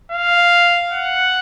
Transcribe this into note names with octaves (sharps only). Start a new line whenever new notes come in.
F5
F#5